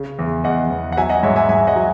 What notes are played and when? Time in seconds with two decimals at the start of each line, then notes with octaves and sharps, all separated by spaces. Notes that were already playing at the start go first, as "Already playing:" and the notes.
Already playing: C#3
0.19 E2
0.44 E2 D#5 F#5
0.71 E2
0.92 F#5
0.97 F#3 E5 G#5
1.09 D#5 F#5
1.23 G#2 C#5 E5
1.36 E5 G#5
1.49 G#2 E5 G#5
1.67 D#5 F#5
1.76 F#3